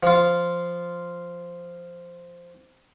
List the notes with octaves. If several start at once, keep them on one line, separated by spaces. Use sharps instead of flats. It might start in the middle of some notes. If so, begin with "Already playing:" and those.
F3 F4